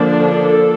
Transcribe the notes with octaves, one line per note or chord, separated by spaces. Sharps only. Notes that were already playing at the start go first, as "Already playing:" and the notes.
Already playing: D3 F3 A#3 D4
A4